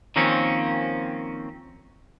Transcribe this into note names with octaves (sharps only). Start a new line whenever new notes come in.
D#3 F3 A#3 C4 C#4